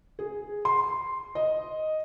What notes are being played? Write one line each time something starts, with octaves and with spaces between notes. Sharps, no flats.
G#4
C6
D#5